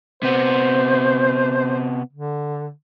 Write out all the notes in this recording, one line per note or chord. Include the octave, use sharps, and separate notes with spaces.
C3 B3 C5
D3